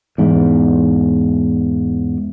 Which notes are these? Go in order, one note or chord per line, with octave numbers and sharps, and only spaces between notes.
E2 G#2